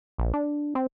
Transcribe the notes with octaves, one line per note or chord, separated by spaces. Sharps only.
A#1
D4
C4